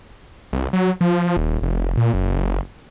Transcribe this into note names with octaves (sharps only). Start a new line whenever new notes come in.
C2
F#3
F3
D#1
F1
A#2
F#1